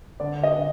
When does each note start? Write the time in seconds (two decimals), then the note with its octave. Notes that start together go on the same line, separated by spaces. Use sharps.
0.20 D3 D5
0.43 D#5
0.55 D3